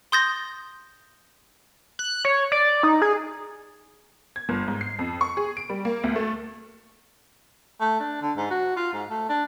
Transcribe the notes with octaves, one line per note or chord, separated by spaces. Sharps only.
C6 D#6 G6 A6 A#6
F#6
C#5
D5
D#4
G#4
G#6
G1
G#2
C7
F2
C#6
G#4
D7
G3
A#3
D2
A3
A3
D4
D3
G#2
F#4
F4
G#2
A3
D4